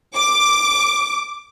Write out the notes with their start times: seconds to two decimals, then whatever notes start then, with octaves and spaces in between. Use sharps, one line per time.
0.15 D6